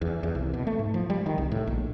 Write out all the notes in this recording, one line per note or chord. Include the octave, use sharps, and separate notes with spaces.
E2
E2
C2
B2
A3
G#2
F3
G3
D#3
C2
A2
A#1